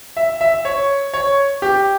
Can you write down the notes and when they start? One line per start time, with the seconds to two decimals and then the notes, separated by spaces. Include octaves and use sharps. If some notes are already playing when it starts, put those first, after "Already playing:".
0.17 E5
0.41 E5
0.65 C#5
1.14 C#5
1.62 G4